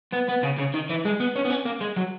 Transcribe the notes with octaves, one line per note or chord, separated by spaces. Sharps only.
B3
B3
C#3
C#3
D#3
E3
G#3
B3
C#4
B3
C#4
A#3
G#3
F#3